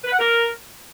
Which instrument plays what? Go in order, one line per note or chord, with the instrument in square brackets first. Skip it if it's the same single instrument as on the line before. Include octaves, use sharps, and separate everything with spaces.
[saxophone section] B4
F#5
A#4